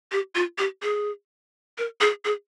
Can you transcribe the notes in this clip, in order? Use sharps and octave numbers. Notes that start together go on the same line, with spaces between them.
G4
F4
G4
G#4
A#4
G#4
G#4